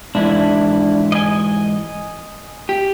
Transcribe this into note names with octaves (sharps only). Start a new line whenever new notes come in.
G#2 E3 D4 E4
D#5 G#5
G4